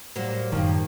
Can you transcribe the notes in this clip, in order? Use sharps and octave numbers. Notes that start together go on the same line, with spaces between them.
A2 F#3 G3 A#3 C5
F#2 D#3 F3 A#3 C4